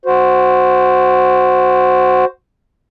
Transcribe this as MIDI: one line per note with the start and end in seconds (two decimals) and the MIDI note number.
0.06 2.25 66
0.06 2.25 72